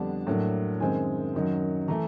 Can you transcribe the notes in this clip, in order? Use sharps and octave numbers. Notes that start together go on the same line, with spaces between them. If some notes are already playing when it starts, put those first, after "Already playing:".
Already playing: F2 D3 G3 B3 D4 A5
A2 F#3 A#3 D4
F#2 D#3 G#3 C4 G#5
F#2 D#3 F#3
E3 A3 A#5